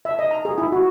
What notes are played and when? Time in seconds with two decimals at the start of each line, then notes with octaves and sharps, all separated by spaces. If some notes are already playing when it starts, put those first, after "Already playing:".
0.05 E5
0.19 D#5
0.31 A#5
0.45 G#4
0.58 E4
0.72 F#4